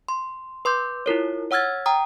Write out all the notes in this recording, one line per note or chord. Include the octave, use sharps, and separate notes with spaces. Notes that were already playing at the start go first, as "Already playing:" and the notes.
C6
B4 C6 D6 G6
E4 F4 A#4 C#5
C#5 F#5 E6 F6 G#6 A6
G5 A#5 D#6